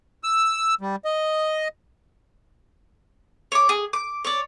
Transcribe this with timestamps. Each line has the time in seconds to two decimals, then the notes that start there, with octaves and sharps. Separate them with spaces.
0.24 E6
0.81 G3
1.05 D#5
3.52 C#5 D6
3.69 G#4
3.93 D6
4.25 C#5 D5